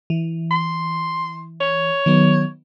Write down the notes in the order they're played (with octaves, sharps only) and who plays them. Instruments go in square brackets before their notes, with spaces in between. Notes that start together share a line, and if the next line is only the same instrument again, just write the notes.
[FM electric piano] E3
[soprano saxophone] C6
C#5
[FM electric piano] D#3 F#3 B3